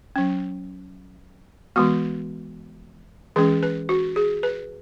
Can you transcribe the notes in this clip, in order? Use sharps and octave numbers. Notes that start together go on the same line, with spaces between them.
F#3 C#4
E3 G#3 B3 F#4
E3 G#3 C#4 G#4
B4
F#4
G#4
B4